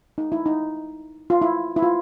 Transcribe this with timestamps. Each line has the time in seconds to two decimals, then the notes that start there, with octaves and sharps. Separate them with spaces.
0.18 D#4
0.32 E4
0.46 D#4
1.30 F4
1.42 E4
1.76 E4
1.83 F4